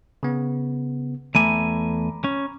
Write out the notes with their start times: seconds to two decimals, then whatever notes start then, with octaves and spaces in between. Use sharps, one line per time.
0.23 C#3 B3
1.35 E2 A3 G#5 A#5 B5 D6
2.24 C#4